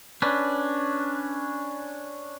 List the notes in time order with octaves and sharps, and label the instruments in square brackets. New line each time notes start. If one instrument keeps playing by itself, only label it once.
[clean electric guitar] C#4 D4 B4